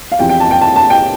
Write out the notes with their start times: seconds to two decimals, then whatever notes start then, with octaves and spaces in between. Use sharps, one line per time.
0.12 F5
0.19 E2 C3 F3 G5
0.29 G5
0.40 A5
0.51 G5
0.61 A5
0.76 A5
0.90 G5